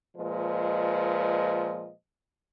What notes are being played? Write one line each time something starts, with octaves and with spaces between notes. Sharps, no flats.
A#2 F3 G#3 B4 D#5